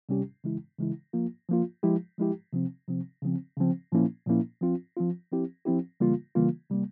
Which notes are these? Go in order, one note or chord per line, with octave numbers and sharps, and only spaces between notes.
C3 G3 C#4 G4
C#3 E3 G#3 E4
C#3 E3 G#3 E4
F3 A#3 F4
F3 A#3 F4
F3 G#3 E4 G4
F3 G#3 E4 G4
C3 F3 C4
C3 F3 C4
C#3 F3 C4
C#3 F3 C4
A#2 F3 A#3 C#4 E4
A#2 F3 A#3 C#4 E4
F3 C4 F4
F3 C4 F4
F3 C4 E4 G4
F3 C4 E4 G4
C#3 E3 G3 A#3 F4
C#3 E3 G3 A#3 F4
C3 G3 A#3